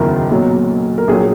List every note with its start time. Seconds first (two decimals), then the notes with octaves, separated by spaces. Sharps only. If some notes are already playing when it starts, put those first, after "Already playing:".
Already playing: F#1 E2 D#3 F#3 E4 A#4
0.30 B1 A#2 F#3
0.98 A#4
1.08 A#1 A#2 F#3 G#4